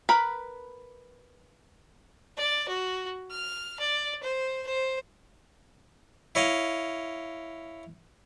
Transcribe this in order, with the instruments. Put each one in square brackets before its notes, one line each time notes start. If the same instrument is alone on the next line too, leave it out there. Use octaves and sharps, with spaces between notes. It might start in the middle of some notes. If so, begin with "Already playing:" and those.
[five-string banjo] A#4 B4 B5
[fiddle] D5
F#4
F6
D5
C5
C5
[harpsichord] E4 C#5 D#5 F5